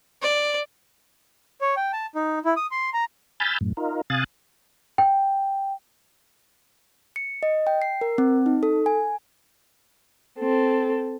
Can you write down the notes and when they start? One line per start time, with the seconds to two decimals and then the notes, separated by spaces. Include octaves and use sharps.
0.22 D5
1.61 C#5
1.77 G5
1.93 A5
2.15 D#4
2.45 E4
2.57 D#6
2.71 C6
2.94 A#5
3.40 G#5 B5 E6 F6 G6 A6
3.61 F#2 A2
3.77 D#4 F4 A#4
4.10 C3 F5 G#5 D#6 F#6 A6
4.98 G5
7.16 C#7
7.43 D#5
7.67 G5
7.82 C7
8.01 A#4
8.18 C4
8.46 D#4
8.63 A4
8.86 G#5
10.39 C4 A4